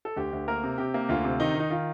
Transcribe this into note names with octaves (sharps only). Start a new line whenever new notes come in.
A4
D2 G4
D2
A#3 A#4
C3
C3 G4
A#3
D2 F4
C3
D#3 D#4
D#3
D#4
D#3 F4